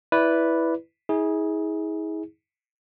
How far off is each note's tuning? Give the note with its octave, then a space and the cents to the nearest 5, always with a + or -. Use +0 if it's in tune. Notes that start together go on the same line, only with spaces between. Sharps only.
E4 +0 B4 +0 D5 -10
E4 -45 G#4 +0